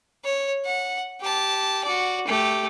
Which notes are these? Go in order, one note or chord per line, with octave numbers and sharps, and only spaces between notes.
C#5
F#5
G4 A5
F#4 D5
A3 G4